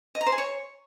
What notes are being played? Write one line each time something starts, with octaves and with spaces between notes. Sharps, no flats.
D#5
A#5
C5
G#4
C#5